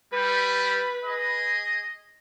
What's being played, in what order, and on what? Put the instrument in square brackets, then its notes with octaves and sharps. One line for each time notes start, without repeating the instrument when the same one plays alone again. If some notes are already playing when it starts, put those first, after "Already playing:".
[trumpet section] G3 [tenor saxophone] B4
[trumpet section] G#4 D#5